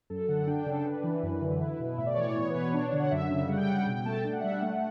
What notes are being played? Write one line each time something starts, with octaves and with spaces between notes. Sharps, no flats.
F#2 A4
D3 F#5
D4 G5
C#3 A4
A4
D4 B4
E3
F#2
D3
E4
B2
A2 E5
D5
E3 C#5
D5
B3 C#5
B4
B2 C#5
D4
D3
F#5
F#2 E5
C#3
G3 F#5
G5
C#3 F#5
B2 G5
A3 A5
D4 G5
F#5
G3 E5
F#5
A3